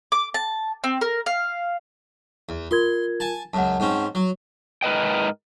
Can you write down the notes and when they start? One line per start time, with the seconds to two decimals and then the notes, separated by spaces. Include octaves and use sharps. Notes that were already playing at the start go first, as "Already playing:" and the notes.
0.12 D6
0.34 A5
0.84 C4
1.01 A#4
1.26 F5
2.49 E2
2.71 F4 A#4 C6 G#6
3.20 G#5 A5
3.54 C#2 F#2 F#5 A5
3.80 G#2 C4 C#4
4.15 F#3
4.83 G#2 A#4 B4 D#5 G5